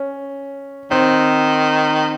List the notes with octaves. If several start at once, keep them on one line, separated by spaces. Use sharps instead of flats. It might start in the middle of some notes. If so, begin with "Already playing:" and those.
Already playing: C#4
D#3 C4